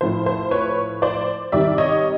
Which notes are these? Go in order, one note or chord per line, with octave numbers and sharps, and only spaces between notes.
A2 F3 C5
C5
B4 C#5
C5 D5
C3 D#3 G3 D5 E5
C#5 D#5